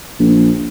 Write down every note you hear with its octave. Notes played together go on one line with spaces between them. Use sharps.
A#1